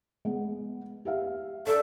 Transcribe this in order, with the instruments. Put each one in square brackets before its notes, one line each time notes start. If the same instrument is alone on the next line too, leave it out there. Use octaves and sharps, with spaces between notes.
[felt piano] G#3 B3
G4 E5 F5
[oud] D4 [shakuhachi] A4